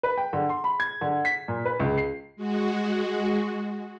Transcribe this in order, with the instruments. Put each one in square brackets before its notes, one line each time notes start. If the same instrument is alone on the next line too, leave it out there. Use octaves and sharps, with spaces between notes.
[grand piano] B4
G5
D3
C6
B5
G#6
D3
B6
A#2
B4
C#2
C7
[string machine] G#3 F#4